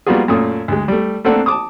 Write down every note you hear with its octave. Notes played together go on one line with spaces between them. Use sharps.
G3 A#3 B3 F4 F#4 G#4
F#2 A#2 A3 D#6
D2 G#3
G3 A3
A3 A#3 C4 D4 A4 F#5
A5 D6 D#6